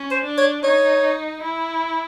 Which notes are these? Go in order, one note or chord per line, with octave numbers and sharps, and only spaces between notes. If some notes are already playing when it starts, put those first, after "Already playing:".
Already playing: C#4
C5
D4
C#5
D#4 C#5
E4